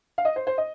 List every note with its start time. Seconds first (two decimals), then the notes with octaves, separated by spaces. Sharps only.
0.18 F5
0.25 D#5
0.36 C5
0.47 C5
0.58 D#5